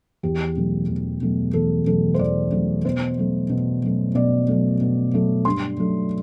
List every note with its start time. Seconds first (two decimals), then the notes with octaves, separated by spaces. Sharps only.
0.23 E2 G4
0.56 B2 F#3 A3
0.89 E2
1.22 B2 F#3 A3
1.54 E2 A4
1.87 B2 F#3 A3 A4
2.14 C5
2.19 E2 D5
2.52 B2 F#3 A3
2.85 B2 C5
3.18 F#3 A3
3.50 B2
3.82 F#3 A3
4.15 B2 D5
4.48 F#3 A3
4.81 B2
5.14 F#3 A3
5.45 G2 C6
5.78 F#3 A3